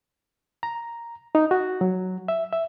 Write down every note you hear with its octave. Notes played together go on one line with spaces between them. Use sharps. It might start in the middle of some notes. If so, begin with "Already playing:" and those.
A#5
D#4
F#4
F#3
E5
E5